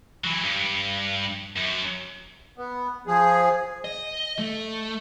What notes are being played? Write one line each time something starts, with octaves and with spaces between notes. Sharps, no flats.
E3 F#3
G2
F#2
B3
F3 G#4
D#5
A3